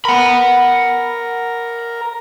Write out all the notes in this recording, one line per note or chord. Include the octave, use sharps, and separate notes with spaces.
A#4 F#5 B5